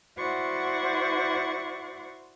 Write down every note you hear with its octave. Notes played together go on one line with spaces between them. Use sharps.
E4 F#4 C5 D5 F#5 C#6